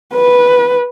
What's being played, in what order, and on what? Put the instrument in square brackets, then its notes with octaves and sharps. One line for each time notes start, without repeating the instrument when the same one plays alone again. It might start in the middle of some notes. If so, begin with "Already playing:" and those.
[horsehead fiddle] B4